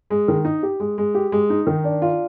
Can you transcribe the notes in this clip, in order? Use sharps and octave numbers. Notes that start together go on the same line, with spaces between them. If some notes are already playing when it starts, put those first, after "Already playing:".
G#3
D#3
D#4
G4
G#3
G#3
G4
G#3
D#4
D#3
D4
F4